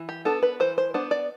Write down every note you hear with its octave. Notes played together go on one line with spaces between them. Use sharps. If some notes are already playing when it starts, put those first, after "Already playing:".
Already playing: E3
G4
B3 D4 A4
B4
E3 C5
C5
B3 D4 C5
D5